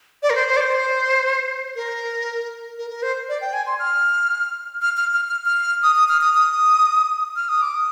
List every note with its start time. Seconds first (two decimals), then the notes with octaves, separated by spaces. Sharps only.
0.23 D5
0.30 A#4
0.35 C5
0.48 C5
0.57 D5
0.61 C5
1.76 A#4
2.78 A#4
2.90 A#4
3.03 C5
3.29 D5
3.41 G5
3.53 G#5
3.66 C6
3.79 F6
4.82 F6
4.97 F6
5.13 F6
5.29 F6
5.46 F6
5.83 D#6
5.96 D#6
6.09 F6
6.21 D#6
6.34 D#6
7.36 F6
7.49 D#6
7.62 D6
7.75 D#6